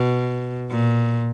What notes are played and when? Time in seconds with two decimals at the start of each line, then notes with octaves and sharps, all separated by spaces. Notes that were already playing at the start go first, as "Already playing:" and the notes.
Already playing: B2
0.70 A#2